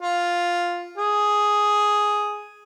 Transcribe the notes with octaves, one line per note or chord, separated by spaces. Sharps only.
F4
G#4